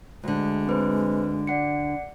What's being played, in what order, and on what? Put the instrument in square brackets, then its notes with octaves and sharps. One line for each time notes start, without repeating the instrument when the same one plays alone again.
[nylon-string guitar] D2 D3 [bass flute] G#3
[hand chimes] C4 B4 C5
D5 F#5 C#7